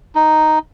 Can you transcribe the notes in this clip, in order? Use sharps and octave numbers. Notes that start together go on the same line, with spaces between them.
D#4